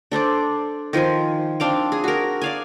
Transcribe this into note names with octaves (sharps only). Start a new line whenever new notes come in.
D4 A4 C5 D5
D#3 F3 C5 G#5
C4 D4 F5 G5
G#4
F#4 A#4
D5 F5 G#5